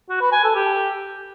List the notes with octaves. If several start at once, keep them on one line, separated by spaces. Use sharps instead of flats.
F#4
B4
G#5
A4
G4